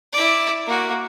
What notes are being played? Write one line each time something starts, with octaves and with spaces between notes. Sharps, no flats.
E4 D5
A#3 F#4